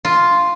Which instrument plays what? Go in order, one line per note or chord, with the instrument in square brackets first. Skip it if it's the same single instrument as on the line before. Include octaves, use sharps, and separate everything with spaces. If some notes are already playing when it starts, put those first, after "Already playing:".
[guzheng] F4